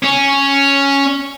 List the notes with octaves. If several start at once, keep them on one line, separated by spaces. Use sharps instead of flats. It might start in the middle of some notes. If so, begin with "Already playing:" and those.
C#4